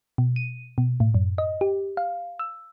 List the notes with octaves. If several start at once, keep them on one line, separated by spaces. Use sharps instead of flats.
B2
D#7
B2
A2
F#2
D#5
G4
F5
E6